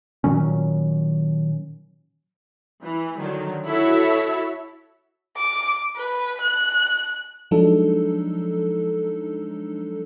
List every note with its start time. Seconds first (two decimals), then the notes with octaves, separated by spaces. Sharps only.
0.24 A#2 D#3 F#3 C#4
2.82 E3
3.18 D3 D#3 F#3
3.67 E4 F#4 A4 C#5 E5
5.37 D6
5.96 B4
6.42 F#6
7.51 F3 F#3 G#3 D4 D#4 A4